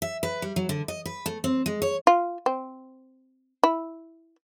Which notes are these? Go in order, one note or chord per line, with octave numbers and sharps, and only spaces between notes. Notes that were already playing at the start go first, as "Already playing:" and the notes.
E5
B4
G3
F#3
D3
D#5
B4
A3
C4
G#3
C#5
F4
C4
E4